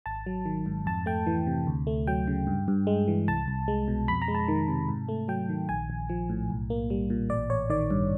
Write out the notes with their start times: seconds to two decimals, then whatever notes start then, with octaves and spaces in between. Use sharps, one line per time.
0.06 G#1 A5
0.26 F#3
0.46 D#3
0.66 G#2
0.86 F2 A5
1.06 A3 G5
1.26 E3
1.47 C3
1.67 D2
1.87 A3
2.07 F#3 G5
2.28 C#3
2.47 G2
2.68 G2
2.87 G#3
3.08 E3
3.28 C2 A5
3.48 C2
3.68 G#3
3.88 B2
4.08 F2 B5
4.22 A#5
4.28 G#3
4.35 A5
4.48 D#3
4.68 C3
4.89 G#2
5.09 A3
5.28 F#3 G5
5.49 D#3
5.69 A#1 G#5
5.90 A#1
6.09 F3
6.29 A2
6.50 B1
6.70 A#3
6.90 G3
7.10 A#2
7.30 A1 D5
7.50 A1 C#5
7.70 D#3 D5
7.90 G2